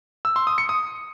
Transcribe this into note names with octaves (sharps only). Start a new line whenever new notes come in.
E6
C6
D#6
C#7
D#6